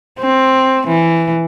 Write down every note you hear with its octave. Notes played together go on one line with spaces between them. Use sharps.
C4
E3